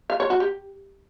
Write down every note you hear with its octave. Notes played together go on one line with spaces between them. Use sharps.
F5
C#5
F#4
G4